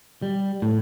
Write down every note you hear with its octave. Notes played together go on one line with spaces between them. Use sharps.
G3
A2